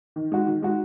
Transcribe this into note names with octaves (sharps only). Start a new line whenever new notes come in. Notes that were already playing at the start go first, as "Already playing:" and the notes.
D#3
G#3 D#4 F#4
D#3
G#3 D#4 F#4